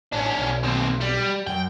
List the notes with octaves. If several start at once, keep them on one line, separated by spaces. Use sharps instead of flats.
A1 C#4 D4
B1
D#2 C4
G3
F#2 G5